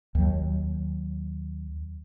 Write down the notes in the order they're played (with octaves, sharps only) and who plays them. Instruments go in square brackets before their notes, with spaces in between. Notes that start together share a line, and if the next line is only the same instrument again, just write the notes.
[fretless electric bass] D#2 F#3